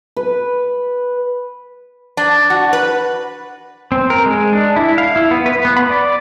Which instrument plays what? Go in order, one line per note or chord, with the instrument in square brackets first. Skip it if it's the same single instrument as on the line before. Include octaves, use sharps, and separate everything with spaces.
[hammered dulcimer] B4
[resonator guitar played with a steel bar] D4
F#4
B4
[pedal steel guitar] C4
A#4
G#3
D4
E4
F5
E4
B3
B4
B3
B5
D5